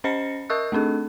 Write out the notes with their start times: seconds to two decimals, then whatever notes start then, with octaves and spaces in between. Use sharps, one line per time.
0.04 C#4 C5 D#5 B5 A#6 C#7
0.50 A#4 D#5 C#6 D#6 E6 F#6
0.72 A3 C4 D4 A4